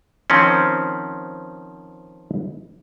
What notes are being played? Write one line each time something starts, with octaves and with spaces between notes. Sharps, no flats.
D#3 F3 C4 C#4